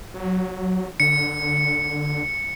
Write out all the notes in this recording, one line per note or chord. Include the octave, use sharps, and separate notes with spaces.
F#3
D3 C#7